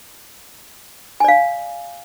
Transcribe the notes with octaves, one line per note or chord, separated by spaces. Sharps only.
D5 F5 G#5